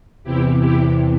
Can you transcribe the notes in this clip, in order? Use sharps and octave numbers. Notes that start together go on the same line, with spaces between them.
E2 C3 E3 E4 G4
E4 G4